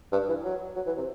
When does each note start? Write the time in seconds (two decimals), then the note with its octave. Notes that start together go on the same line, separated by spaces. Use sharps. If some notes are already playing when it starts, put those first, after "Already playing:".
0.12 G2
0.28 E3
0.44 F#3
0.76 F#3
0.86 E3
0.97 C3